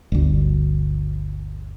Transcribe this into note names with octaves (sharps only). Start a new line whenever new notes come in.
G1 D2